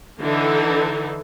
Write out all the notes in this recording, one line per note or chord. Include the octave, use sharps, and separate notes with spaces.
D3 E3 D#4 A4